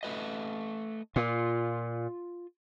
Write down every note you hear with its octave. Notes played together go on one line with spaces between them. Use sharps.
A3 B4 D#5
A#2 F4